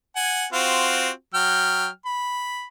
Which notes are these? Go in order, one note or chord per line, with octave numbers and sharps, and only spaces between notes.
F#5 G#5
C4 F4 F#4
F#3 G5 F6
B5